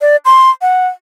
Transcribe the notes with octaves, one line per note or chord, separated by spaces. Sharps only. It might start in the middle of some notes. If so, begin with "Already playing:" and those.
D5
C6
F#5